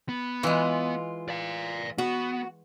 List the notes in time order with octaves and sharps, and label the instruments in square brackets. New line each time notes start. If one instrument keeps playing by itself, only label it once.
[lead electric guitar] B3
[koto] E3 G#3 [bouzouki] F4
[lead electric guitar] D5 F5
[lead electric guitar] B3 [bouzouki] F#4